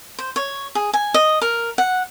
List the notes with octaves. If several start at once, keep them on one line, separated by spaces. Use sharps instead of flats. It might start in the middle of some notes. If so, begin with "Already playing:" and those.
C5
C#5
G#4
G#5
D#5
A#4
F#5